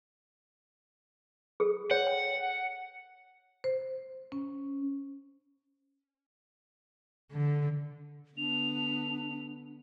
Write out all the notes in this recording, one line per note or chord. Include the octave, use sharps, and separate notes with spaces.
G#4 A4
C#5 F#5
G5
C5
C#4
D3
D3 B3 D4 F7